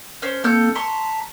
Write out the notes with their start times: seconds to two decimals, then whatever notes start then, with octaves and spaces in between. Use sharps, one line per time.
0.22 C#4 C5
0.44 A#3 C4 A4 F6 G6
0.75 A5 A#5 C6 C#6 B6